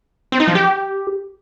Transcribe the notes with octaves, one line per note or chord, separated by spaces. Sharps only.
C4
D#4
F3
G4